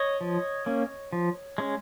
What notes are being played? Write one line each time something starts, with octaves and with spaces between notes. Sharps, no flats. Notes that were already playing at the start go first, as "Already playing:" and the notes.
Already playing: C#5 D#5
F3
A#3 C#4
F3
G#3 C#4